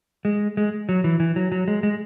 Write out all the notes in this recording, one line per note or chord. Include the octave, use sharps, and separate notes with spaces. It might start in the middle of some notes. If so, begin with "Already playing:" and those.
G#3
G#3
F#3
E3
E3
F#3
F#3
G#3
G#3